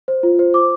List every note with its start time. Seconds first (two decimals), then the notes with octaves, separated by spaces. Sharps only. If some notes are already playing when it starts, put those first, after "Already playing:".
0.08 C5
0.23 F4
0.39 C5
0.54 D6